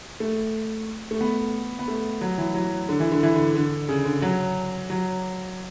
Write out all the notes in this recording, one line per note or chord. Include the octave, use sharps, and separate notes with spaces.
A3
A3
B3
B3
A3
F#3
E3
F#3
D3
E3
D3
E3
D3
D3
C#3
D3
F#3
F#3